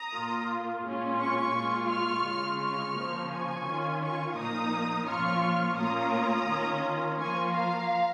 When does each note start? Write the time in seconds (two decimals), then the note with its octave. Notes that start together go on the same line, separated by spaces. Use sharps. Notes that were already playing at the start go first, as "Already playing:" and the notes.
Already playing: A#5 D#6
0.14 A#2 A#3 F4
0.85 A#2 G#3 C#4 F4
1.20 G#5 C#6
1.55 A#2 G#3 F4
1.90 C#6 F6
2.26 C#3 G#3 F4
2.61 C#6 F6
2.96 C#3 F3 A#3
3.32 G#5 C#6
3.66 D#3 C#4 F4
4.02 G#5 C#6
4.37 A#2 F3 A#3 D#4 A#5 D#6
5.08 A#2 F3 C#4 F4 C#6 F6
5.78 A#2 A#3 C#4 F4 A#5 D#6
6.48 D#3 C#4 F4
7.19 F3 A#3 F4 G#5 C#6
7.54 F5 A#5